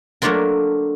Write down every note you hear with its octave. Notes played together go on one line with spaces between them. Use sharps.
F#3 A3 A#3 D4 F4 A#4